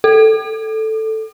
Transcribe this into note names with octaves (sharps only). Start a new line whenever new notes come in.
A4